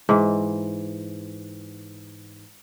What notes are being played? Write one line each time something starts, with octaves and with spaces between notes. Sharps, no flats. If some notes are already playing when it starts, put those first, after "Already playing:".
G#2 E3